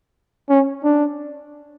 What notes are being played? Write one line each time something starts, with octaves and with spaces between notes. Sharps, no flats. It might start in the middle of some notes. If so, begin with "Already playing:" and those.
C#4
D4